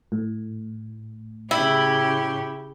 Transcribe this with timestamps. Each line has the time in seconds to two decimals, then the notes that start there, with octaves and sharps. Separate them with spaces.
0.12 A2
1.51 C#3 E4 G4